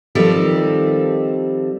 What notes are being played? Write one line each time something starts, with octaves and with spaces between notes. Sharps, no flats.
D#3 F3 G3 C4 G4 A4